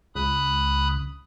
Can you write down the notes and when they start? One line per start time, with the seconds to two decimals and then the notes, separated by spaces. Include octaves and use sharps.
0.15 C#2 B5 D#6 F#6